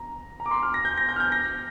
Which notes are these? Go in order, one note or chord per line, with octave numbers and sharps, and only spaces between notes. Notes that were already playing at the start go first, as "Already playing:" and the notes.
Already playing: A#5
A#5
D6
C6
F6
A#6
G6
A#6
G6
F6
G6
A#6